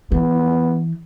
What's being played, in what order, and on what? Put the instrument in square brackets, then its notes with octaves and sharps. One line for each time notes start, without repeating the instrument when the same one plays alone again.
[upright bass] E3 [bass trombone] B3